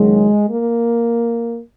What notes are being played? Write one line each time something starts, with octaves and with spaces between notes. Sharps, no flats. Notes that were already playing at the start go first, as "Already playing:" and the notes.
Already playing: F#1 F#2 D#3 F#3 G#3
A#3